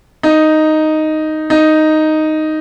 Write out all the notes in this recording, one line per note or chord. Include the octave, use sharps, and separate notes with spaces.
D#4
D#4